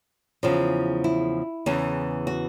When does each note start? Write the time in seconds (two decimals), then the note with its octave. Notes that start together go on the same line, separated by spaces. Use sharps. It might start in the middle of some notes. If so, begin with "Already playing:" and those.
0.43 E2 C#3 F3
1.04 E4
1.66 E2 C#3 E3
2.27 F#4